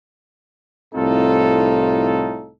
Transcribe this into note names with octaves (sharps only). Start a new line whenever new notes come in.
C2 A2 C4 D#4 F4 A4